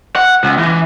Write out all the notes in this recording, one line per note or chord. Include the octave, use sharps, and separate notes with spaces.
F#5
C#2
E3